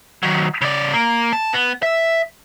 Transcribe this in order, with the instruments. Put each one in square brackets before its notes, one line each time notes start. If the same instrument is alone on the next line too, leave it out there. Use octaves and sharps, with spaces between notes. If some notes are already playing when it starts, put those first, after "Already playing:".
[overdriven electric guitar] D#3 F#3
C#3 D5
A#3
A5
B3
E5